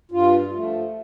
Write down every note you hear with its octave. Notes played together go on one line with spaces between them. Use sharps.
G2 F4
F3 A3